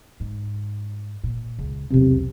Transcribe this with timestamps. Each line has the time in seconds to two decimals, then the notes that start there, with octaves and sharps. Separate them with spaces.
0.20 G#2
1.24 A#2
1.59 C#2
1.91 B1 E2 C3